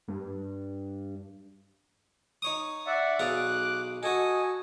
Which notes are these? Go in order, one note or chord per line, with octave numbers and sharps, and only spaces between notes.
G2
D#4 C#5 D#6
D5 E5 F#5
B1 G#4 F5 D6 F#6
F#4 A4 D#5 G#5